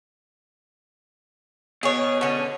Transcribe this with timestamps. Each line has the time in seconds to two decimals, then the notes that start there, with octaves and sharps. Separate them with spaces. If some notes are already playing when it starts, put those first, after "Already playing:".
1.83 B2 G#4 C#5
2.21 D3 C#4